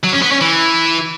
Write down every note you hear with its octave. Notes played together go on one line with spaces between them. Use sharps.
F#3
C#4
B3
C#4
E3